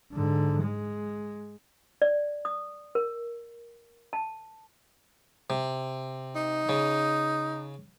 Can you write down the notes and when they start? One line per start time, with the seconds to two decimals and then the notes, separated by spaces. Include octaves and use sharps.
0.12 G#2 D3
0.63 G#3
2.02 D5
2.45 D#6
2.95 A#4
4.13 A5
5.50 C3
6.36 D#4
6.69 C#3